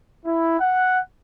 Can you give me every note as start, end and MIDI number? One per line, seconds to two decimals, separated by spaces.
0.25 0.58 64
0.60 1.01 78